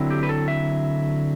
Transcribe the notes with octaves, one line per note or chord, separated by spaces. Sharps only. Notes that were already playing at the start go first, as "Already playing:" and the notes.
Already playing: D3 F#3 C4 E4
G4
B4
A4
E5